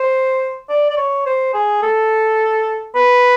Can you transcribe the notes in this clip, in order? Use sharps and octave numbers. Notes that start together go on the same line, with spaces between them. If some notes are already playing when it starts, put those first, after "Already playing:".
Already playing: C5
D5
D5
C#5
C5
G#4
A4
B4